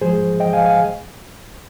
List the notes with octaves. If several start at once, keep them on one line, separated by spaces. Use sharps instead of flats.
G#2 F3 G#3 G#4 C5
D#5 G5
F5 G#5
F5 G#5